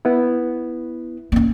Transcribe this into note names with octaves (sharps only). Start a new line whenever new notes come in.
B3 E4
A#3 C#4